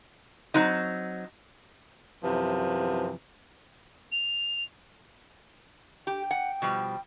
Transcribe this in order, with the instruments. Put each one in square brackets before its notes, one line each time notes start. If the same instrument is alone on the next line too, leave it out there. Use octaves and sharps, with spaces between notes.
[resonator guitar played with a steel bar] F#3 C4 D#4
[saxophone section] F#2 C3 E3 F3
[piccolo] F7
[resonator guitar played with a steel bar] G4 [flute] G5
[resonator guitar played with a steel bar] F#5
B2 F3 G3